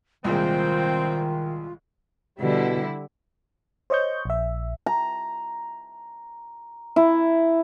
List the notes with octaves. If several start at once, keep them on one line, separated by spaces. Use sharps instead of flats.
C2 A#2 D#3 G#3 C4 F4
B2 D3 G3 E4
C5 C#5 D#5 C#6 G6
A#1 E5
A#5
E4